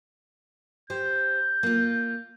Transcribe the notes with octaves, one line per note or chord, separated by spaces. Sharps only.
G4 C5 G6
A#3 F4